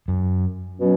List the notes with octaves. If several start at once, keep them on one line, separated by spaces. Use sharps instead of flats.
F#2
B2 F#3 C#4